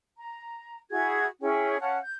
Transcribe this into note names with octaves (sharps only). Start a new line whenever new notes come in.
A#5
E4 F#4 G#4 G#6
C#4 E4 G#4 G5
C#4 F5 F#5 A5
G6